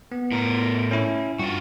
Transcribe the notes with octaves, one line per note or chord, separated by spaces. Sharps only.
B3
A2 A#4
C#4 E4
G2 F4 F#4